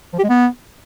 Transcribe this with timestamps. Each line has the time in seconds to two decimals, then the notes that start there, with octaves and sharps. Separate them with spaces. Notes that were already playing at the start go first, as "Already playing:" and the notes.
0.13 F3
0.19 G4
0.24 G#3
0.29 B3